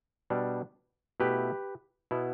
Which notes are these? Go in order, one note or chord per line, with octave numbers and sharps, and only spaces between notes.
B2 G3 D4
B2 A3 E4 G4 B4
B2 B3 E4